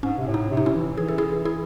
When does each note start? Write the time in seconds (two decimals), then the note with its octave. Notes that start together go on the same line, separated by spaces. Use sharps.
0.03 G#2 C#4
0.18 C3
0.27 A2
0.34 D#4
0.51 C3
0.57 D#4
0.66 C#4 E4
0.75 E3
0.97 E3 G#4
1.08 A4
1.18 E4 G#4
1.45 E4 G#4